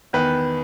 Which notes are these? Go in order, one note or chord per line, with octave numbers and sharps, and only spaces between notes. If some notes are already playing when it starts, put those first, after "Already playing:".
E2 D#3 B4